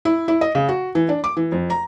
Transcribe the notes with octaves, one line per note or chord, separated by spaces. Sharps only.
E4
E4
D#5
C#3
F#4
E3
D4
D6
E3
F2
A#5